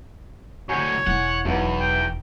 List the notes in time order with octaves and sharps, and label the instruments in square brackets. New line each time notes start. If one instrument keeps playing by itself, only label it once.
[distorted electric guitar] D3 F#3 [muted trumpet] C#5 [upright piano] G#5 G6 C#7
[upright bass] E1 E4 [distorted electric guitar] F#5
[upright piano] B1 B3 [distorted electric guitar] E2
[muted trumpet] G5